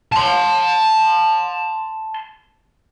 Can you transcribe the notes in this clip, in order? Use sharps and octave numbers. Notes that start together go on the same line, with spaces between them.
A5 C6